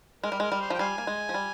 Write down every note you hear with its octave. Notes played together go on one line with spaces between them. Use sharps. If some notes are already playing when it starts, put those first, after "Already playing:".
G#3 A#4
G3
G#3 A#4
G3
C5
F3 G5
G3 C5 F5 G#5
A#3
G#3
F3
G3